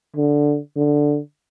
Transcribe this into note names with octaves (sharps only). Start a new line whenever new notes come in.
D3
D3